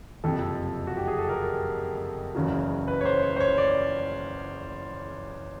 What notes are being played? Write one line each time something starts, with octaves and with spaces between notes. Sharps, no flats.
F#1 F2 C3 A4
F#4
G4
G#4
A4
A#4
F#1 E2 C#3 F#3
B4
C#5
C5
C#5
C5
C#5
D5